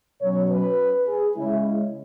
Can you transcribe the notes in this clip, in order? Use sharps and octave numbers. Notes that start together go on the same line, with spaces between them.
B2 F#3 C#4 C#5
B4
G#4
C#3 G#3 C#4 E4